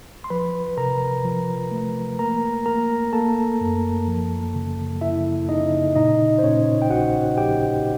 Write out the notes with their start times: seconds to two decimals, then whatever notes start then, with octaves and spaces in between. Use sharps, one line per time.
0.24 C6
0.30 F3 B4 B5
0.77 C3 A#4 A#5
1.24 F3
1.71 A3
2.19 A#3 A#4 A#5
2.66 A#3 A#4 A#5
3.13 A#3 A4 A5
3.61 F#2
4.08 F3
4.55 C#3
5.01 C#3 E4 E5
5.49 C#3 D#4 D#5
5.96 A#2 D#4 D#5
6.38 C5
6.43 A#2 C#4 C#5
6.82 G5
6.90 A#1 F#4 F#5
7.37 A#1 G4 G5